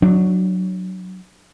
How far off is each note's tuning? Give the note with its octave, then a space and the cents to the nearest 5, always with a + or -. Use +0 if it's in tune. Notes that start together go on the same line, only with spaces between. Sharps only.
F#3 +0 D4 +25